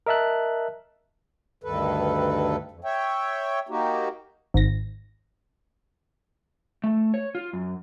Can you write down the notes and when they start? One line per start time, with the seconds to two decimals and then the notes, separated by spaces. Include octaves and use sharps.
0.06 A#4 D#5 E5 A5 F#6
1.64 D2 G2 D#3 A4 B4
2.71 F2
2.85 C#5 E5 G5
3.69 A#3 D#4 F#4 G4
4.54 G#1 A#6
6.84 A3
7.14 C#5
7.35 F4
7.53 F#2